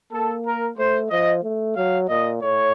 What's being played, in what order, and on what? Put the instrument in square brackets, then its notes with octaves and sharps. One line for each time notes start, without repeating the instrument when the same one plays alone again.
[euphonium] A#3 [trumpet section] A4
[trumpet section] A#4
[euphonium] A3 [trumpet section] C5
[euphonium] F3 [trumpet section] D#5
[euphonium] A3
[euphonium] F#3 [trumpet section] F5
[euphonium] A#2 [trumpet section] D#5
[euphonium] A2 [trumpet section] C#5